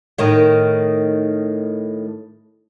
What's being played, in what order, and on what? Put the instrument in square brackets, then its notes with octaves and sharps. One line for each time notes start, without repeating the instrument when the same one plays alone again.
[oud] A2 D#3